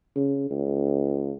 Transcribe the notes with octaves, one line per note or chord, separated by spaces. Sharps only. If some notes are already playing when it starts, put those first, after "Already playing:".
C#3
C#2